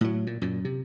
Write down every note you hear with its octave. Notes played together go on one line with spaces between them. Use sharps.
A2 F#3
A#2
F#2 A#2
C3